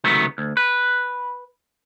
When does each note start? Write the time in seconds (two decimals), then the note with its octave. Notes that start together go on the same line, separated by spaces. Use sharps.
0.04 C#2 C3 D#3 F#3 A3 B3
0.38 D2
0.57 B4